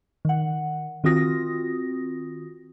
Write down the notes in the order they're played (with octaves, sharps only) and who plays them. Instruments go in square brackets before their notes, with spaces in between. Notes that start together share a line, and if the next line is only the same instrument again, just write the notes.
[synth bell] D#3 F#5
D#3 C4 F4 F#4 D#6 A#6